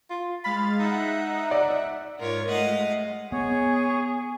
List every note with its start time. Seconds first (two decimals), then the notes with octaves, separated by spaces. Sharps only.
0.10 F4
0.44 G#3 F5 B5 A6
0.79 D#4 E5 F#5
1.51 D5
2.18 G#2 F4 A#4 C#5
2.49 G#3 A3 D#5 F5 F#5
3.32 B3 G#4 C#5